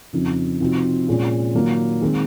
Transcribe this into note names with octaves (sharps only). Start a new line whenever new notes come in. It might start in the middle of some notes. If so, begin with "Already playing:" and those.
F2 C#3 F3 C4 D#4
C3 F3 C4 D#4 F#4
A#2 G#3 C#4 F4
D#3 F#3 A#3 F4
D#3 G#3 C4